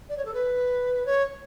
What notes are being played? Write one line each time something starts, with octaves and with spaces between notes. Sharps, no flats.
D5
C#5
A4
B4
C#5